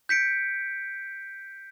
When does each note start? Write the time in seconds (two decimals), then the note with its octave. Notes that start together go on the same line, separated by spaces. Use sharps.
0.09 G6 B6 C#7 D7